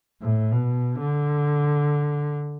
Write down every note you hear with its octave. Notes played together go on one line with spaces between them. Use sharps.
A2
B2
D3